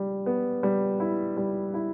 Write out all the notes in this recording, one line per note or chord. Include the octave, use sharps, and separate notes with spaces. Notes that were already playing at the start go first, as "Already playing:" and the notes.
Already playing: G3
B3
G3
E4
G3
E4